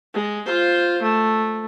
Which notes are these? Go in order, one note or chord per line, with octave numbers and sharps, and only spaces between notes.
G#3
F4 C5
A3